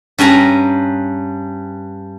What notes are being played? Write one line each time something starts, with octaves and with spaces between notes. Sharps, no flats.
G2 C#4 G#5 A#5